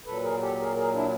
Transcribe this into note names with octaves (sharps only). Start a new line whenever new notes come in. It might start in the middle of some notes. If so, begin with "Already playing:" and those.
A#2 F#3 A4 B4
G#4 A#4
G4 A4
G#4 A#4
G#4 A#4
D4 E4